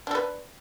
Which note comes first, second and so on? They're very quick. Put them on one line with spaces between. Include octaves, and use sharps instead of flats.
D4 A4 B4